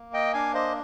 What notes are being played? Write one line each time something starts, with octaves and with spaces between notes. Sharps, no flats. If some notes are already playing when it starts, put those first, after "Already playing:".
Already playing: A#3
D#5 G5
D4 F5 G#5
C5 D#5